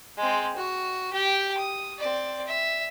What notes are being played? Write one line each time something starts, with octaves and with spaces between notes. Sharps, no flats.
G#3 C4
F#4
G4 G5
D#6
C4 D5
E5